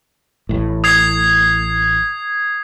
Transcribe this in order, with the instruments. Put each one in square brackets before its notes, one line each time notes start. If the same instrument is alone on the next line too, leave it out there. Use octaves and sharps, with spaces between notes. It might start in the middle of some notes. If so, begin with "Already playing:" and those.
[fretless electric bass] A1 A2
[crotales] D#6 G#6 C7